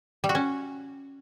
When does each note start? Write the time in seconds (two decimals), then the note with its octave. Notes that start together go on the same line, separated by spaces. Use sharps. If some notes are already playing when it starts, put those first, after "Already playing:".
0.24 G3
0.29 F#4
0.35 C#4